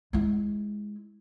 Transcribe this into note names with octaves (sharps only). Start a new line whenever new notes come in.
G#3 E4